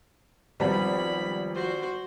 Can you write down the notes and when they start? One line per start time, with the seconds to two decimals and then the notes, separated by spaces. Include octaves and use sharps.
0.60 G#1 F3 G3 B3 B5
1.55 F#4 C5